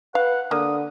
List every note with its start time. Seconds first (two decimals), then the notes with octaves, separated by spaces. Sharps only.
0.15 B4 F5 F#5
0.51 D3 A#3 D#6